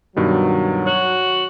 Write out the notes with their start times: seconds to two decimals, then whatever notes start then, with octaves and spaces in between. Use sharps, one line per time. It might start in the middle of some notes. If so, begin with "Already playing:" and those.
0.16 G2 B2 D#3 F#3
0.86 F#4 C#5